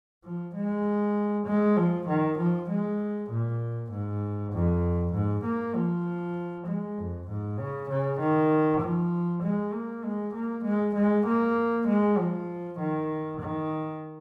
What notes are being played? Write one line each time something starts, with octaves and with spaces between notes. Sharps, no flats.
F3
G#3
G#3
F3
D#3
F3
G#3
A#2
G#2
F2
G#2
A#3
F3
G#3
F2
G#2
C#3
C#3
D#3
F3
G#3
A#3
G#3
A#3
G#3
G#3
A#3
G#3
F3
D#3
D#3